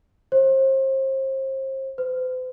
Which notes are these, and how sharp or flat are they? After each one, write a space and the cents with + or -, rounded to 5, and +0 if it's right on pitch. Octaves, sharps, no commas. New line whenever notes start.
C5 +35
C5 -45